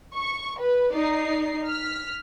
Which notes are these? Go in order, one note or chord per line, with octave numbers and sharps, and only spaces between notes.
C#6
B4
D#4 D5 C7
F6 B6